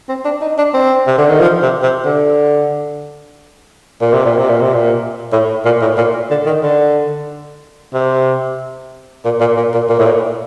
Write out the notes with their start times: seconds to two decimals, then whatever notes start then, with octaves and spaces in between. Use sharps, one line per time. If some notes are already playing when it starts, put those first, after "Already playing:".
0.09 C4
0.25 D4
0.41 D#4
0.58 D4
0.74 C4
1.07 C3
1.18 D3
1.29 D#3
1.40 F3
1.62 C3
1.83 C3
2.05 D3
4.01 A#2
4.13 C3
4.26 A#2
4.38 C3
4.49 A#2
4.61 C3
4.74 A#2
5.33 A2
5.65 A#2
5.81 A2
5.97 A#2
6.31 D3
6.46 D#3
6.63 D3
7.94 C3
9.25 A#2
9.40 A#2
9.57 A#2
9.74 A#2
9.90 A#2
9.99 A2
10.06 A#2